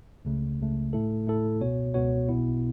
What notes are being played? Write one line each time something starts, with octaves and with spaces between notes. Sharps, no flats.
C#2 C#3 A3
C#2 C#3 A3
A2 A3 E4 A4
A2 A3 E4 A4
C#2 B2 B3 F#4 C#5
C#2 B2 B3 F#4 C#5
B1 B2 B3 E4